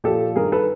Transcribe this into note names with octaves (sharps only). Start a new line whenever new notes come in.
A#2 F3 G4 A4
G2 D#3 G#4 A#4
A4 B4